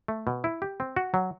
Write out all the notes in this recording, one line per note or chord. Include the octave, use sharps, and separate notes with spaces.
A3
B2
E4
G4
C4
F#4
F#3